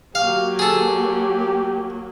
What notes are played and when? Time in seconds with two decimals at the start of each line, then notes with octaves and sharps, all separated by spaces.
0.15 F#3 A#3 G4 F5
0.59 G#4 A4